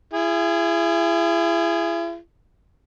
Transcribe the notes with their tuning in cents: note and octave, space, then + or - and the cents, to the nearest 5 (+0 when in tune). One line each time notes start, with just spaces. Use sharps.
E4 +40 G#4 -10